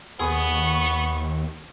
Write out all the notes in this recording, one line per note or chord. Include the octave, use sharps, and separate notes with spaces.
D#2 B3 G#4 C#6